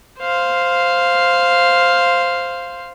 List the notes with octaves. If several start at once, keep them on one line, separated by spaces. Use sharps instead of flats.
C5 F5